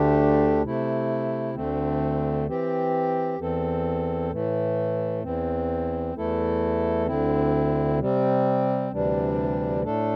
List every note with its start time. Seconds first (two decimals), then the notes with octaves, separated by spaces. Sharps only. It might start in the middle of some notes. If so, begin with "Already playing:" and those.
Already playing: D2 D3 A3 D4 G4
0.63 C3 A3 E4
1.55 D2 D3 A3 C4
2.47 E3 C4 G4
3.39 E2 E3 C4 A4
4.30 A2 E3 A3
5.23 E2 E3 C4
6.16 E2 E3 A3 E4 A4
7.07 D2 D3 C4 E4
7.99 C3 G3 C4
8.91 D2 C3 E3 G3 D4
9.83 A2 A3 D4 A4